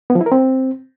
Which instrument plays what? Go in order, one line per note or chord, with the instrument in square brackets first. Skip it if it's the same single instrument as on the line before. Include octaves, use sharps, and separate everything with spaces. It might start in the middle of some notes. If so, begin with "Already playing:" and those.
[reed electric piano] B3
F3
E4
A#4
C4